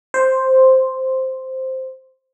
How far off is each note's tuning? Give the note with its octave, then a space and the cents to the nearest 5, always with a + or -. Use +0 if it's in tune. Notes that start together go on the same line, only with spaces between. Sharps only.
C5 +0